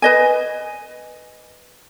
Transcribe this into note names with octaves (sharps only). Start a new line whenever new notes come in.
B4 D#5 G#5